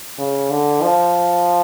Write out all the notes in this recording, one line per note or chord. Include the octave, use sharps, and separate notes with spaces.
C#3
D3
F3